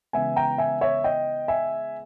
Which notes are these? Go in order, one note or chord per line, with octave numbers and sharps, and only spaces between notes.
C#3 E3 G#3 B3 E5 G#5
G5 A#5
E5 G#5
C#5 E5
D#5 G5
E5 G#5